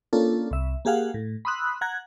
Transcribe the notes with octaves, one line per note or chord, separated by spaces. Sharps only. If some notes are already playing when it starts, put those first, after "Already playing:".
A#3 C#4 D4 F4 A4
C2 E5
A#3 G4 G#4 F5 F#5
A2
B5 C6 D#6 E6 F#6
F#5 A#5 F#6 G#6